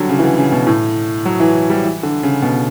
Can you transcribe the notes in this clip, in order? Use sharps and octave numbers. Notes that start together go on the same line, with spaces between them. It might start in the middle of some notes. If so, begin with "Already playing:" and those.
Already playing: D3 F#3 G3
C#3
E3
D3
C#3
B2
A2
F#3
E3
G3
E3
D3
C#3
B2